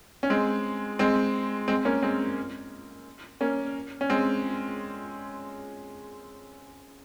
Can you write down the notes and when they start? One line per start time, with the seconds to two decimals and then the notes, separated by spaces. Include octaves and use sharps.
0.23 C#4
0.30 G#3 C4
0.99 G#3 C4
1.68 G#3 C4
1.85 A#3 C#4
2.02 G#3 C4
3.41 A#3 C#4
4.01 C#4
4.10 G#3 C4